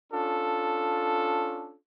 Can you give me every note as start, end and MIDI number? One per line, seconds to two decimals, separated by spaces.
0.13 1.75 61
0.13 1.75 62
0.13 1.75 65
0.13 1.75 69